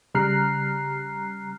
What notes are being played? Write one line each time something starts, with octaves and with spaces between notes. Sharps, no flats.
C#3 G3 A#5 F6 F#6 C7